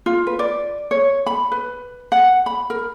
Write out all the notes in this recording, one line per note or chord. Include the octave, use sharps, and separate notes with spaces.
F4
B4
D5
C#5
B5
B4
F#5
B5
A#4